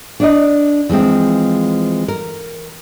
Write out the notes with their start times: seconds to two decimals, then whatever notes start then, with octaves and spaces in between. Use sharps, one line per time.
0.20 D4 D5 D#5
0.89 E3 F3 G#3 C4
2.08 A#4